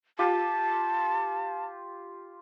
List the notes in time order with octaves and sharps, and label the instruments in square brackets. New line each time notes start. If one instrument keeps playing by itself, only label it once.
[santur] F4 G4 [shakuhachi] A5